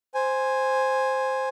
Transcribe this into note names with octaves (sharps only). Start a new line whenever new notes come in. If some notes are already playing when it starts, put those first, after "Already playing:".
C5 G#5